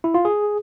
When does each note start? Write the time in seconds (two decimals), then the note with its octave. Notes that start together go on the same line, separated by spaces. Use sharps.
0.04 E4
0.14 F4
0.25 G#4